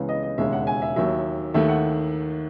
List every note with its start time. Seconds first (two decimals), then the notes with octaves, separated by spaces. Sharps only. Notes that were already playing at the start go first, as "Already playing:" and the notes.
Already playing: C#2 C#3 E3 G#3 B3
0.09 D#5
0.23 D#5
0.38 E1 D#2 C#3 G#3 E5
0.52 F#5
0.67 G#5
0.82 E5
0.96 D#2 D#3 F#3 E5
1.54 D#2 D#3 A3 E5
1.69 F#5